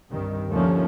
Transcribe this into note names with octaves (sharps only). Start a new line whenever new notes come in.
C2 G2 D#3
D#2 D3 F3 A3 C#4